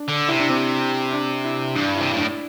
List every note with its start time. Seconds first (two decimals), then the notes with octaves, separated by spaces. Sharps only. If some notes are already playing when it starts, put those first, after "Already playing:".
Already playing: D4
0.08 D3
0.29 C3 E4
0.40 D4
0.50 C4
1.13 D4
1.45 E4
1.75 G2 D4
1.97 C3 E4
2.13 A2 D4